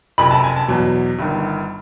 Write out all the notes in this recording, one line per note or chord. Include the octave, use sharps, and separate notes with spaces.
F#1 F2 C3 B5
A5
G#5
A5
E2 B2 F#3
G1 G2 D#3